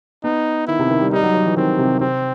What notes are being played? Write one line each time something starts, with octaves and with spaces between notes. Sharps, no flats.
B3 D#4
D#3 E4
C3
D#3
G3
G3 D#4
F#3
F#3
E3
D#3 C4
C3
C3 C4